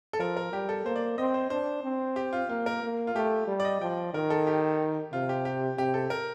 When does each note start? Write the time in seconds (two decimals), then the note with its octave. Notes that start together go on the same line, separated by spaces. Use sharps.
0.13 A4
0.19 F3 A#4
0.37 A#4
0.52 G3 G4
0.69 A4
0.85 A#3 C5
0.96 D5
1.18 C4 D#5
1.34 C5
1.50 D4 C5
1.84 C4
2.16 G4
2.33 F4
2.49 A#3 F4
2.66 A#4
2.83 A#3
3.07 F4
3.15 A3 G4
3.47 G3
3.60 D5
3.65 D#5
3.81 F3 G5
4.14 D#3 A#4
4.30 A4
4.47 G4
5.12 C3 F4
5.29 G4
5.45 G4
5.78 C3 G4
5.94 A4
6.10 A#4